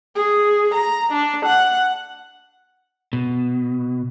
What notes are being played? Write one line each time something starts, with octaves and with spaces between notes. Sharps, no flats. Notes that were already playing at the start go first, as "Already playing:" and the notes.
G#4
A#5
D4
F#5
B2